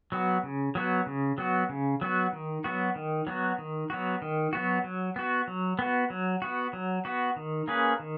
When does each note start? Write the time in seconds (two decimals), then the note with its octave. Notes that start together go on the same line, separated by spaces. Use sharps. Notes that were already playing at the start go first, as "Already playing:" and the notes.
0.12 F#3 B3 F#4
0.43 C#3
0.75 F#3 B3 F#4
1.06 C#3
1.38 F#3 B3 F#4
1.69 C#3
2.01 F#3 B3 F#4
2.33 D#3
2.64 F#3 B3 F#4
2.96 D#3
3.27 F#3 B3 F#4
3.58 D#3
3.90 F#3 B3 F#4
4.22 D#3
4.53 F#3 B3 F#4
4.84 F#3
5.16 B3 F#4
5.48 F#3
5.79 B3 F#4
6.10 F#3
6.42 B3 F#4
6.73 F#3
7.05 B3 F#4
7.36 D#3
7.68 A#3 C#4 G#4 B4
8.00 D#3